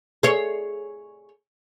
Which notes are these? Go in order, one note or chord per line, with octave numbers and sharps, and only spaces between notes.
G#4 C#5